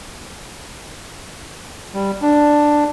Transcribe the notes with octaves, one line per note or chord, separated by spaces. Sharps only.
G3
D4